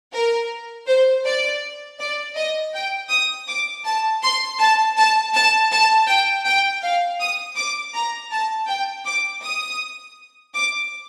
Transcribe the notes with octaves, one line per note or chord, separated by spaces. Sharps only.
A#4
C5
D5
D5
D#5
G5
D#6
D6
A5
C6
A5
A5
A5
A5
G5
G5
F5
D#6
D6
A#5
A5
G5
D6
D#6
D6